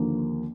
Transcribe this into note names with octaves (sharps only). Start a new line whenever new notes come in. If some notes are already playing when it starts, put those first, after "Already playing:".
Already playing: D#2 D3 F3 A#3